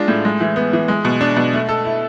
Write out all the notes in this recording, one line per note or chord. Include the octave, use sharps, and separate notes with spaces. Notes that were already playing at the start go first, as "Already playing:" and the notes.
Already playing: G#3 D4 F4
A2
G#3
E3
B3
E3
G#3
B2
D4
B2
A3
A4
E4